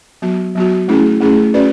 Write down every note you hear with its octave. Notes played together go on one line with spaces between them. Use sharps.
F#3 B3 F#4
F#3 B3 F#4
A3 C#4 E4 G#4
A3 C#4 E4 G#4
C#4 F#4 B4 D5